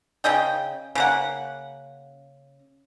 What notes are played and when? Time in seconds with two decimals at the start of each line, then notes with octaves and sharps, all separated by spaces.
0.24 C#3 G#4 D#5 G5
0.95 C#3 A#3 F#5